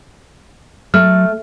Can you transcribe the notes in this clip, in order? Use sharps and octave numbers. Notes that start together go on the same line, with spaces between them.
F#3 A3 F6